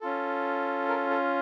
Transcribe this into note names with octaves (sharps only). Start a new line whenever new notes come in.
C#4 F4 A4
A#4
A4